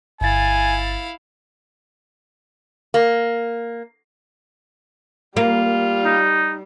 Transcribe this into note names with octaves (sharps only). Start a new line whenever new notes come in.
G1 E4 F5 G#5 A6
A#3
G3 A#3 F4
D#4